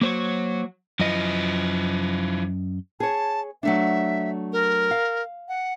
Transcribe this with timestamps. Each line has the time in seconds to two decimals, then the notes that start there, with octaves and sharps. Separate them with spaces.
0.01 F#3 A#3 C5 C#5
1.00 F#2 F3 E4 D#5
3.00 G#4 C#5 A5
3.63 F#3 A3 D4 E5
4.52 A#4
4.91 F5
5.48 F#5